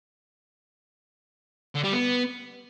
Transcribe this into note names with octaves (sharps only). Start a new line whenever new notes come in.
D3
G3
B3